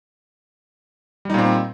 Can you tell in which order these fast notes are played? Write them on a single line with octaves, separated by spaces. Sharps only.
G3 D#4 A#2 C4